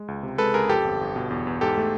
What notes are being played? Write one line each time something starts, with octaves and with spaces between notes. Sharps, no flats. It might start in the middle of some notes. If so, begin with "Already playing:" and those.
Already playing: G#3
C#2
C3
G#3 A4 B4
C#2 G#4 A#4
F2 G4 A4
G1
G1
B2
E2
E2
G#2 G4 A4
A3